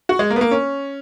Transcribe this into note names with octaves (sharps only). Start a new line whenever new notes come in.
F#4
G#3
A#3
B3
A#3
C#4